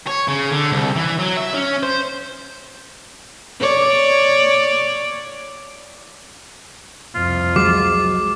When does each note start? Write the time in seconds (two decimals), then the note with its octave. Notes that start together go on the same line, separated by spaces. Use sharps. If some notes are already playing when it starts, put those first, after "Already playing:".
0.08 C#5
0.28 C#3
0.52 D3
0.72 C2
0.96 E3
1.19 F#3
1.37 E5
1.55 C#4
1.83 C5
3.60 C#5 D5
7.15 C2 F2 F4
7.56 F#3 G#3 D6